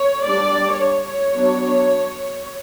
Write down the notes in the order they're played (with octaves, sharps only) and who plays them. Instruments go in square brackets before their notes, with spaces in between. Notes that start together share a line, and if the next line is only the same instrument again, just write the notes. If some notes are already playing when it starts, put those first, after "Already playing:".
Already playing: [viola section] C#5
G3 D4 D5
C#5
F#3 B3 D4